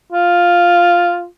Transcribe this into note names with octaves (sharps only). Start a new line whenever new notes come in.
F4